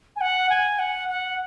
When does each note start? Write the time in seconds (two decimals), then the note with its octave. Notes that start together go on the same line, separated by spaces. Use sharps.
0.16 G#5
0.21 F#5
0.50 G#5
0.79 F#5
1.09 F#5